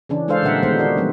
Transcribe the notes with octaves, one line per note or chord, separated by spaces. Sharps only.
C#3 E3 C#4 D4
G#3 D4 A4 C5 F5
A#2 D3 G3 A#4 E5 F#5
D#3 G3 G#3 B3 D#4 C5
D4 F#4
F3 G3 G#3 B3